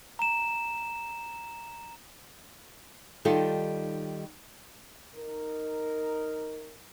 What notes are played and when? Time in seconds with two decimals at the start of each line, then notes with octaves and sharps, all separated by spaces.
0.19 A#5 E7
3.25 D#3 G3 D#4 F4 A4
5.15 D#4 A#4